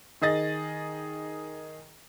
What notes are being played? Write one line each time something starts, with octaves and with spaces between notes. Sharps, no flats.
D#3 G#4 D#5 A6